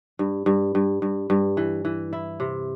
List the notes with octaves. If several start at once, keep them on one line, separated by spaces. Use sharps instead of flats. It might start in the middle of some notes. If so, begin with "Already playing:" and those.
G2
G2
G2
G2
G2
E3
E3
E4
C3